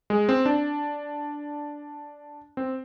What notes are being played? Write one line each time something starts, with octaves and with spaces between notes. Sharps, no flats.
G#3
C4
D4
C4